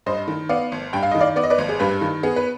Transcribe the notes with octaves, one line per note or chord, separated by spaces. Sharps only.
G2 C5 D#5
D#3
B3 D5 F5
G#1
G2 G5
F5
D#3 D#5
D5 F5
B3 D5
D#5
B4 D5
G#1
G#4
G2 G4 B4
D#3
B3 G#4
B4